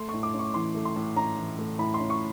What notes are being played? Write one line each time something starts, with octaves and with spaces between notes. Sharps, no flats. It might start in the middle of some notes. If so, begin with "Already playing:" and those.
Already playing: A3 C6
A2 C#6
D6
C#4
C#6
E3 C6
A3
C6
A2
C#4 A#5
E3
A3
A2 B5
C6
C#4
C#6